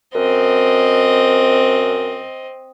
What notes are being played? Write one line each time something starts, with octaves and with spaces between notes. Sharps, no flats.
F#2 C4 D#5